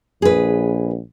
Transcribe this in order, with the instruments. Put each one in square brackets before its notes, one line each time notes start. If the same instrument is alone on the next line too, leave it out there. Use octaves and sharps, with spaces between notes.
[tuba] A#1 [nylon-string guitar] G#4 B4